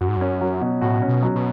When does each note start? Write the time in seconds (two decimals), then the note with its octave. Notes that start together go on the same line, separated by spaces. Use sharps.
0.01 F#2 F#4
0.09 G#2
0.17 F#2 C#4
0.41 F#3
0.61 B2
0.81 A2 F#4
1.02 C#4
1.08 B2
1.22 F#3
1.35 B2